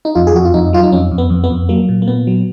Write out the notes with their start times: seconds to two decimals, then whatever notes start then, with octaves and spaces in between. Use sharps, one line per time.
0.05 D#4
0.15 F2 F4
0.27 G#4
0.34 F2 F#4
0.45 F4
0.54 F2 D#4
0.73 F#3 F4
0.83 D#4
0.92 F2 C#4
1.12 F2
1.18 B3
1.30 F2
1.44 B3
1.50 F2
1.69 F#3 A#3
1.89 A#2
2.02 A#3
2.07 A#2 B3
2.27 F#3